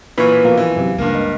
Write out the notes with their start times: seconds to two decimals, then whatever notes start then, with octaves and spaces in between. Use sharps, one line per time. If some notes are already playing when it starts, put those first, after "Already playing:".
0.18 A#2 E3 B4 C#5 B5
0.45 B2 F3 A#3 F5
0.57 E3
0.76 F#2 C3
0.98 C#2 G2 A#3
1.15 D#5